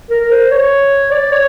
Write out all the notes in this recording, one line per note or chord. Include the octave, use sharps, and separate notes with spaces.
A#4
C5
C#5
D5
C#5